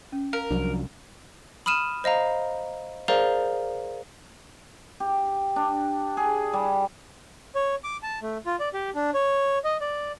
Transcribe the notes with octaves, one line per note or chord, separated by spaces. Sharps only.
C#4
A#4 F5
C2 F3 F#3 D4
B5 D#6 F6 D#7 E7
C5 D#5 F5 A#5
G#4 A#4 C5 D5 F5 A#5
G4
D4
G#4
G3
C#5
D6
A5
A3
F4
D5
G4
D4
C#5
D#5
D5